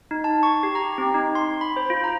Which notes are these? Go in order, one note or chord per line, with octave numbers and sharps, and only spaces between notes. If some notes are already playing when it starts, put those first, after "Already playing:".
D#4
A5
C#6
G4
A#5
C4
D#4
C6
B5
C5
F4
A#5